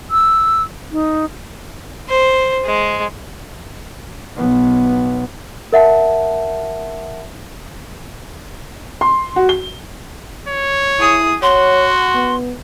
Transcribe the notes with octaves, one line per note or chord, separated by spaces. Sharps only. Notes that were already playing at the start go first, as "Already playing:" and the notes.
E6
D#4
C5
G#3
B1 B3
A#4 E5 F#5 A5
C6
F#4
G7
C#5
E4 G#4 D#6
F#4 C#5 F#5 C6
B3